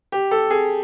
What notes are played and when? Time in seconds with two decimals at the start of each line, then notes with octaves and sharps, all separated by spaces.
0.12 G4
0.31 A4
0.50 G#4